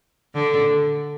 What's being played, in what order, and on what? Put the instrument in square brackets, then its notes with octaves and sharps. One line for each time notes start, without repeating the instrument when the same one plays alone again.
[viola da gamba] D3